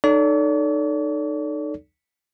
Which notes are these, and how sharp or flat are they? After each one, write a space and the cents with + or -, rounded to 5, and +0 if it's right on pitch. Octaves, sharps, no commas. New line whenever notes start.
D#4 -30 A4 +0 D5 -45